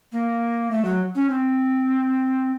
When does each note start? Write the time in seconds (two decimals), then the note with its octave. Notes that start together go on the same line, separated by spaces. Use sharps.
0.12 A#3
0.71 A3
0.85 F#3
1.15 C#4
1.30 C4